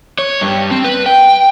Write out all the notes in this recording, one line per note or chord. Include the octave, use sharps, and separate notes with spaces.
C#5
G2
C4
B4
G5